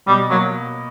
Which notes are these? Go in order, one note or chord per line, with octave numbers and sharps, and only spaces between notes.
B2 G3
F#3 A#3